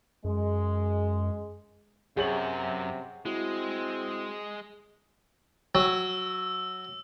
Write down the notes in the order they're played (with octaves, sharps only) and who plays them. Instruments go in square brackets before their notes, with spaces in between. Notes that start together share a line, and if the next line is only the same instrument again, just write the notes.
[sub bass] F#2 [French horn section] G#3
[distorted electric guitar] F#2 [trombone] C3 [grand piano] G#4 C#5 F#7 [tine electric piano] F#5 G6 A6
[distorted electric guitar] G#3 [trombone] C4 [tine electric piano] E4 F#4
[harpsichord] F#3 [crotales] E6